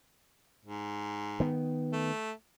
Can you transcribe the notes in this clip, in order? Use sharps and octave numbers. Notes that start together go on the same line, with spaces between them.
G#2
D#3 B3
A3